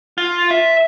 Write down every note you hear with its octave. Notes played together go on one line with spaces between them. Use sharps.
F4
E5